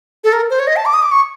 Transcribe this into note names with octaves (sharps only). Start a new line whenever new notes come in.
A4
A#4
C5
C#5
D#5
A5
D6
D#6
D6
C#6